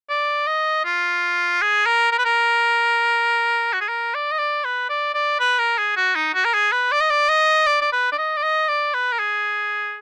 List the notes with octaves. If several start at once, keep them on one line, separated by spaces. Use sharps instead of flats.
D5
D#5
F4
G#4
A#4
A#4
B4
A#4
F#4
G#4
A#4
D5
D#5
D5
B4
D5
D5
B4
A#4
G#4
F#4
D#4
F#4
A#4
G#4
B4
D5
D#5
D5
D#5
D5
D5
B4
D5
D#5
D5
D#5
D5
B4
A#4
G#4